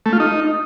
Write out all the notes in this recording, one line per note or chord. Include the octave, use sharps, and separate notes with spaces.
A3
F4
D#4